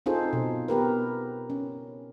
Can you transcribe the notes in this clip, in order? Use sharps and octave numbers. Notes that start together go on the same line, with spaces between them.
C4 D#4 F4 G#4 A4 C5
B2
B3 G4 A#4 B4
C#4